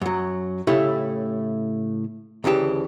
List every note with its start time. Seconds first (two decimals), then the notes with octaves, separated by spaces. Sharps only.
0.01 F#2 F#3
0.67 A2 C#3 A3 E4 G4 E5
2.44 D2 C#3 E3 G4 A5